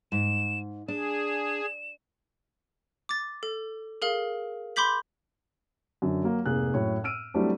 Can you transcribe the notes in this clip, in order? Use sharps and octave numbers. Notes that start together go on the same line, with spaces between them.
G#2 E7
D4 G#4 E7
D6 A6
A4
G#4 A#4 F5
B5 C6 D6 G6 B6 F#7
F#2 D3
F#3 A#3 F#4
F1 G#2 A#3 G#4 F#6
F#2 A2 C#5
E6 F6 D7 D#7
F#3 G3 A3 C4 D4 E4